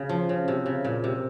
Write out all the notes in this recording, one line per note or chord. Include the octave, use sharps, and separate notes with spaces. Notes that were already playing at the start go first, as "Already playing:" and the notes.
Already playing: C#3
F3
C#3
C3
C#3
A#2
C3